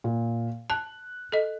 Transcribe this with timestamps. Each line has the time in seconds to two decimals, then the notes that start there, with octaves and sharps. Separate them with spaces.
0.04 A#2
0.70 A5 F#6
1.32 A4 D#5